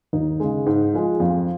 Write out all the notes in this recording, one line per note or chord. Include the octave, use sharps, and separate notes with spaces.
D#2 D#4
C#3 G#3
G#2
F3 G#3
F2 F4